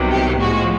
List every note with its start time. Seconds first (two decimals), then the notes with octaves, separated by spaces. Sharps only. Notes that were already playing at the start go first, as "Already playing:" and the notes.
Already playing: C2 C3 D#3 F#3 B3
0.10 G4
0.40 A2 F3 G#3 F#4